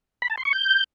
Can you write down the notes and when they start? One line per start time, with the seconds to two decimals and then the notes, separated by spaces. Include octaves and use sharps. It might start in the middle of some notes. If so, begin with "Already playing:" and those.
0.22 B5
0.30 A5
0.38 C6
0.45 C#6
0.53 G6